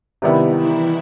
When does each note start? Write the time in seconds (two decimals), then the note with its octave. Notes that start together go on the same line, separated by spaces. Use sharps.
0.22 C3 D#3 G3 B3 E4
0.56 E3 E4